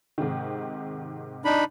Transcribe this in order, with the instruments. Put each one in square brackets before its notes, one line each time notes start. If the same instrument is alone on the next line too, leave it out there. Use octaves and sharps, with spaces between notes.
[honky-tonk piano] G#2 C3 D#3
[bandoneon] D4 D#4 B5